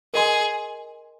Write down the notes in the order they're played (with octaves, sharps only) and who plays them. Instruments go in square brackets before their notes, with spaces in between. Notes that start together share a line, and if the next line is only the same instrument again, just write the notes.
[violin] G#4 [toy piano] A#4 D#5 G#5 C6